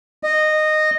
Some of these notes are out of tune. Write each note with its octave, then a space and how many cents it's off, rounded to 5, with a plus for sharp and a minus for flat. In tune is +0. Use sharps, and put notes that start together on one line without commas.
D#5 -15